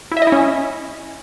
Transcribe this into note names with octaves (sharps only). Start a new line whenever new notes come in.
E4
E5
D#5
E4
C#4